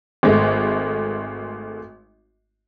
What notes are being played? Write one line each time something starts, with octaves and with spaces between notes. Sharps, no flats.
G#1 G#3 A3